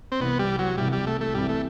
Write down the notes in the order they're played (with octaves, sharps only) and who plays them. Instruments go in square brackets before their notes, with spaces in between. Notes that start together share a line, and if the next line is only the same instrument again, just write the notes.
[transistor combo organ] C4
[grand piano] C2 C3 E3 [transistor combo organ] B3
[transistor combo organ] G3
F#3
[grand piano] C2 C3 E3 [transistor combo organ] G3
[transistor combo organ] G3
A3
A3
[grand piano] C2 C3 E3 [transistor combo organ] G3
[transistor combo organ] A3